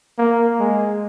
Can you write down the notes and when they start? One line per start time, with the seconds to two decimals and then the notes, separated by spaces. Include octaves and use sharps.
0.18 A#3
0.60 G#3